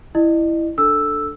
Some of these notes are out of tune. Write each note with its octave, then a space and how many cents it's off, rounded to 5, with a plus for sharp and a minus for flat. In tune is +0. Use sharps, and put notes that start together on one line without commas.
E4 +0 D#5 -40
D4 +0 A4 +0 E6 +0